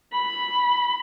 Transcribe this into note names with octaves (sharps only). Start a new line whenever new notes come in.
B5